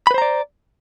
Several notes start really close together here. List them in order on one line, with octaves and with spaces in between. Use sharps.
B5 B4 C5 A#5 D5